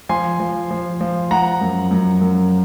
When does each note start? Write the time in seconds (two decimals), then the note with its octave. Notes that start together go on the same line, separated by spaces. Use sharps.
0.09 F3 G#5 C6
0.40 F3
0.71 F3
1.01 F3
1.31 F3 F#5 A#5
1.61 F#2
1.91 F#2
2.21 F#2